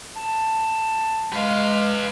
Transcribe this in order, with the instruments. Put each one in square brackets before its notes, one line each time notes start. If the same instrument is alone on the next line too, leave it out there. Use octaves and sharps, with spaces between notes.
[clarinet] A5
[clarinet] G#3 [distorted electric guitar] B4 F5